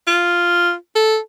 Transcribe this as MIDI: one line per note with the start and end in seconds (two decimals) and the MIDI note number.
0.07 0.74 65
0.96 1.18 69